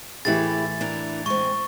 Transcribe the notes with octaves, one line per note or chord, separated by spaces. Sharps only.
A2 E3 E4 G4 G#4 A6
D4 E4 A#4
G#3 C4 C#6